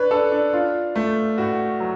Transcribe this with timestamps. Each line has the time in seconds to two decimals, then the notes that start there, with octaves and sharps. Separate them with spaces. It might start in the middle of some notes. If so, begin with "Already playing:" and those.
Already playing: D4 B4 C#5
0.11 D4 A4
0.32 D4
0.53 D4 F4
0.95 A3
1.38 A2 F#4
1.80 F#3